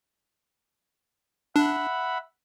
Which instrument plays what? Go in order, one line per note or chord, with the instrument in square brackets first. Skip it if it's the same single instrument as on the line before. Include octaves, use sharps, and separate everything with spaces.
[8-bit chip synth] D4 [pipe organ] E5 F#5 B5